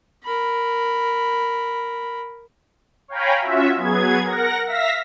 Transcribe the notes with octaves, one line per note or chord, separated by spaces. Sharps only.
A#4 B5
C#5 F5 G5 G#5 A#5 B5
C#4 F4 F#4 E5
F#3 B3 G#4 G#6
A#4 F#5 A#6
E5 F5 A#6 B6